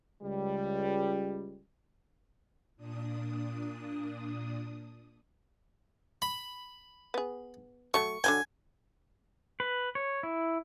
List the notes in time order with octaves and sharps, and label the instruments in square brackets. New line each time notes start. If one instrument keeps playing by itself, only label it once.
[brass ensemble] C#2 G3
[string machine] A#2 D4 D#6
[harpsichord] B5
[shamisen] B3 G#4
[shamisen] F#3 A3 [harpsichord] C#6
[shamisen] D3 F#3 G5 [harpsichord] G#5
[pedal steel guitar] B4
C#5
E4